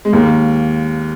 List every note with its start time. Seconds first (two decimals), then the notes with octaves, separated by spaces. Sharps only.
0.05 G#3
0.13 D#2 A#3